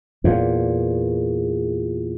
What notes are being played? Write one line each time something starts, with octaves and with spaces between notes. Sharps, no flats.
E2 A#2